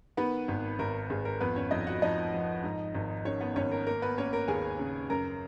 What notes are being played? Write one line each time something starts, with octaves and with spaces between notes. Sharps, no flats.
D#3 B3 B4
G#1
G#1 A#4
G#1 G#4
A#4
F2 B3 B4
C#4 C#5
F2 D#4 D#5
F#4 F#5
F3 D#4 D#5
F3
G#2
G#1
D#3 C#4 C#5
B3 B4
G#1 C#4 C#5
A#4
A#3 A#4
B3 B4
A#3 C#4 C#5
A#4
D#2 G#4 G#5
C#3
F#2 A#4 A#5